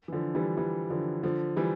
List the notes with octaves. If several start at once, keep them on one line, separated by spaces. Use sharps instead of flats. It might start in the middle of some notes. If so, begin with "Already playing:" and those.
E3
D3 F3
E3 G3
E3 G3
D3 F3
D3 F3
E3 G3